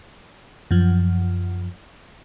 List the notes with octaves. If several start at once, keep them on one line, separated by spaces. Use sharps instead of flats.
F#2 F3